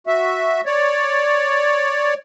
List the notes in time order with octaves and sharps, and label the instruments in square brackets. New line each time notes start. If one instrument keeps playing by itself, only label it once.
[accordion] F#4 E5
C#5 D5